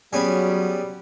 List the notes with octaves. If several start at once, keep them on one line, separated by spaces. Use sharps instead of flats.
F#3 G3 B3 C#4 G#4